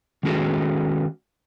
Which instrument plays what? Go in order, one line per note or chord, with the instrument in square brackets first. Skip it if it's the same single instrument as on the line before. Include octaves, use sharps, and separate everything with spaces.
[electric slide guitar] D#3 G#3 C#4 F#4 G#4 A4